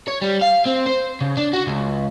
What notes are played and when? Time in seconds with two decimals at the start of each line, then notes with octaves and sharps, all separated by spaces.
0.08 C#5
0.22 G3
0.42 F5
0.66 C4
0.87 C5
1.21 C#3
1.37 D4
1.53 F#4
1.67 C#2